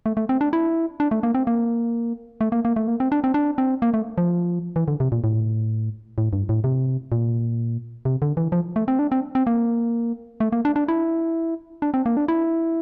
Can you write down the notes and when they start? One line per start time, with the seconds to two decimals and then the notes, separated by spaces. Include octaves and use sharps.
0.06 A3
0.17 A3
0.29 C4
0.41 D4
0.53 E4
1.00 D4
1.11 A3
1.23 A#3
1.35 C4
1.47 A#3
2.41 A3
2.52 A#3
2.65 A#3
2.76 A3
2.88 A#3
3.00 C4
3.12 D4
3.24 C4
3.34 D4
3.58 C4
3.82 A#3
3.94 A3
4.18 F3
4.76 E3
4.88 D3
5.00 C3
5.12 A#2
5.24 A2
6.18 A2
6.33 G2
6.49 A2
6.64 C3
7.12 A#2
8.05 C3
8.22 D3
8.37 E3
8.52 F3
8.76 A3
8.88 C4
8.99 D4
9.12 C4
9.35 C4
9.47 A#3
10.40 A3
10.52 A#3
10.65 D4
10.76 D4
10.88 E4
11.82 D4
11.94 C4
12.06 A#3
12.17 D4
12.28 E4